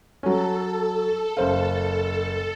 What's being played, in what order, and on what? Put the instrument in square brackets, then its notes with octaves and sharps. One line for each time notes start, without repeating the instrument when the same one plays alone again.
[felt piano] F#3 C#4 [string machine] A4
[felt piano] F#1 C5 F5